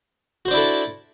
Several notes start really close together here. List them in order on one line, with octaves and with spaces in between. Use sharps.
F#4 C5 D4 E4 A4